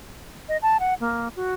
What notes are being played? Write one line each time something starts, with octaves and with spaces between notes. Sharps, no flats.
D#5
A5
F#5
A#3
F#4